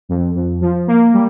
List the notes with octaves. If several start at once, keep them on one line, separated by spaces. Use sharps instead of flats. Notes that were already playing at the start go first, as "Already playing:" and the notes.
F2
F2
F3
A#3
G3